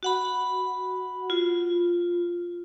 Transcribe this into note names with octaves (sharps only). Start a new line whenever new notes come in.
F#4 F#5 B5
F4